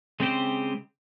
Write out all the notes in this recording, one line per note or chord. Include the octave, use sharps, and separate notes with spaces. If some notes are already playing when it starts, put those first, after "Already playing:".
C#3 G#3 C4 G4 C5